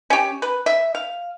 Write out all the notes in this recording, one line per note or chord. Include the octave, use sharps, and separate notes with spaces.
C#4 G4
B4
E5
F5